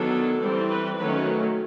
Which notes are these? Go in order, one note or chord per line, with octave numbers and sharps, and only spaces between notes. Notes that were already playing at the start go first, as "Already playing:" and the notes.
Already playing: D#3 F#3 B3 D4 A4
E3 G3 C4
B4
D#3 F#3 A3 C#4 B4